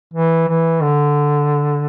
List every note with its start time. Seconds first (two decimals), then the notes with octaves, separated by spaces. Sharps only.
0.14 E3
0.48 E3
0.83 D3